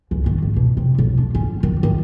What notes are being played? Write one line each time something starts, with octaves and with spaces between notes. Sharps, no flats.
C#2
D#3
G#1
B2
C3
B1
D4
C#4
D#3
D#3